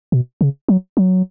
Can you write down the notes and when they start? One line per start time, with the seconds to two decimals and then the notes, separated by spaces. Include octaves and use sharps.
0.12 B2
0.41 C#3
0.69 F#3
0.97 F#3